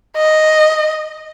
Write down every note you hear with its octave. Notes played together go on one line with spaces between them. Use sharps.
D#5